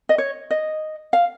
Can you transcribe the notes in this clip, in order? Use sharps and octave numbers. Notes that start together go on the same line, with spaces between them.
D#5
C#5
D#5
F5